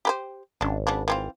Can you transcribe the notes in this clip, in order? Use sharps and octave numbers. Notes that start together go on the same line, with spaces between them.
G4 B4 C5
G#1 C#4 D4
C#3 B3 D4
E3 C4 F4